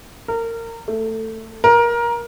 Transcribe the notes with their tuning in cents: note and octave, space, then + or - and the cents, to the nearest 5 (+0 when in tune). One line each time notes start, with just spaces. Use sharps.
A#4 -25
A3 +15
A#4 +20